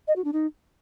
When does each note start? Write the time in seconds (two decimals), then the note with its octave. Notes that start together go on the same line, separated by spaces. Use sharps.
0.08 D#5
0.16 F#4
0.25 D4
0.33 D#4